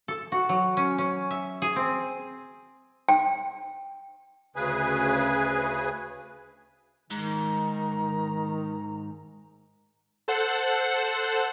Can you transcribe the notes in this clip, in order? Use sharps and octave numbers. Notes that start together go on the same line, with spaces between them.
A4
F#4
F#3
C#4
C#4
E5
G#4
C4
G5
D2 C#3 G#4 B4 G#5
G#2 D#3 A#5
A4 C5 F#5